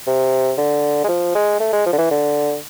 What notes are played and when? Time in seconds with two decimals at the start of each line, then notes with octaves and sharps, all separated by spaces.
0.07 C3
0.58 D3
1.04 G#3
1.08 F3
1.35 G#3
1.60 A3
1.73 G#3
1.86 F3
1.93 D3
1.98 E3
2.11 D3